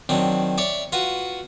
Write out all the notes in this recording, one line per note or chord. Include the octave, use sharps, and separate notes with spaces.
D#3 F#3 C4 D4
C#5 D5 E5 D6
F4 F#4 B4 F#5